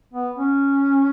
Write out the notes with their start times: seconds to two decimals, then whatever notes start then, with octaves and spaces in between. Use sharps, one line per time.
0.13 B3
0.37 C#4